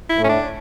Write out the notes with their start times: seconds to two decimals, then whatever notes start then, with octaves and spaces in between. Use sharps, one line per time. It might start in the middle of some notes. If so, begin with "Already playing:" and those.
0.10 E4
0.18 A2
0.24 C#4
0.29 D4